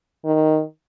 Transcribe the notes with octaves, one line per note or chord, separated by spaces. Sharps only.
D#3